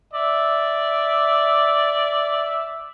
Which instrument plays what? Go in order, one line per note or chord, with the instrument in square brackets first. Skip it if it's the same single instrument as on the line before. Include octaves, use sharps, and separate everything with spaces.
[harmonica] D5 E5